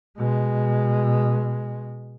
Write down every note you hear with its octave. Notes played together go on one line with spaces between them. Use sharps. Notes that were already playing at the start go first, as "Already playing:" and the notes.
B2 G#3